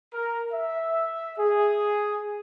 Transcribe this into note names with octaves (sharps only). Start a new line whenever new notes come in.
A#4
E5
G#4